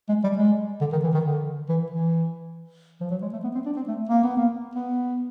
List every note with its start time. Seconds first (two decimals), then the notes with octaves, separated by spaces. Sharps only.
0.09 G#3
0.24 G3
0.37 G#3
0.81 D3
0.92 D#3
1.03 E3
1.14 D#3
1.25 D3
1.69 E3
1.90 E3
3.01 F3
3.11 F#3
3.22 G#3
3.32 A3
3.44 B3
3.55 C4
3.66 D4
3.76 C4
3.88 A3
4.09 A#3
4.23 B3
4.37 A#3
4.75 B3